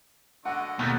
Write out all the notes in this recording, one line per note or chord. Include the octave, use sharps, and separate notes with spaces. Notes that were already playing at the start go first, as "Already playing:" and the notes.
D3 D#5 F#5 C#6
D#2 B2 D#3 A3 D#4 D#6